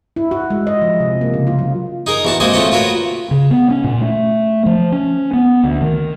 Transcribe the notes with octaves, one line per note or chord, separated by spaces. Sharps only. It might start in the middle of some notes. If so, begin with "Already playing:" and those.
E4
F#4
G#3
D#5
F3
C3
A#3
C#3
F4
F#3
D#4 G#4 A#4
E2 F#4 A5
G#3 A#3 C4 F#4 G#4 D#5
A3 C4 F4 C#5 D#5 F#5
F4 F#4 A#4 B4 C#5
C#3
B3
C#4
A#2
A3
F3
C#4
B3
D2
D#3